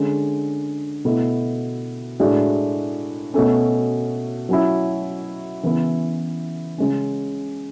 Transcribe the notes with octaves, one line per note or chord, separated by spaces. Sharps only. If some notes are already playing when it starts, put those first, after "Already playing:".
Already playing: D3 G#3 C#4
B2 A3 E4
A2 G#3 D4 F#4
B2 A3 C#4
F#3 C#4 E4
C#3 E3 B3 E4
C#3 G#3 C#4